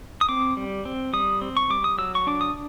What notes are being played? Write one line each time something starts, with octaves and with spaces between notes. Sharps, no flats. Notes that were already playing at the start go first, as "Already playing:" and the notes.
D#6
C4 D6
G3
C4
G3 D#6
C4
C#6
G3 D6
D#6
F#3 E6
C#6
D4 D6
D#6